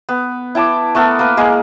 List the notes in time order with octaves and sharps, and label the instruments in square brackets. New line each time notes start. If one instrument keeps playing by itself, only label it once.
[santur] B3
E4 G5 A5 D6
A3 B3 A4 A#4
A#3 A#4 B4
G#3 A#3 G#4